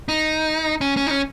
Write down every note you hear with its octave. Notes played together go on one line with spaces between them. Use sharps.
D#4
C#4
C#4
D#4
C#4